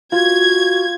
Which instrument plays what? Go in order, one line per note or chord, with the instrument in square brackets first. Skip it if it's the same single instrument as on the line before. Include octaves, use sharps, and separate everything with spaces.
[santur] F4 [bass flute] F#4 [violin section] G#6